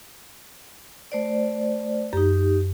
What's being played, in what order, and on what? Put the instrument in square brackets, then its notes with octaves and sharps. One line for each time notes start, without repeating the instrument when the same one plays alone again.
[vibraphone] A3 C5 D5
[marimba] F#2 [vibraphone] D#4 G4